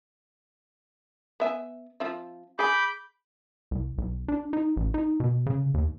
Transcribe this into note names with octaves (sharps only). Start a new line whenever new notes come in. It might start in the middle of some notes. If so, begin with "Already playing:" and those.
B3 E5 G#5
F3 C4 E5
G#4 G#5 B5 D6 G6
C2
B1
D4
D#4
A1
D#4
B2
C#3
D#2